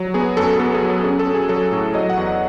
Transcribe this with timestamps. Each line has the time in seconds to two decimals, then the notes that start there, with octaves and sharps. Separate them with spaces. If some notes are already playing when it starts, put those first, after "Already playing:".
Already playing: F#3
0.14 B3 G#4
0.37 F#2 A4
0.59 B3 A4
0.75 G#4
0.83 F#3
0.90 A4
1.04 C#4 G#4
1.19 A4
1.27 C#4
1.34 G#4
1.49 F#3 A4
1.72 A2
1.94 F#3 D#5
2.10 F#5
2.17 E2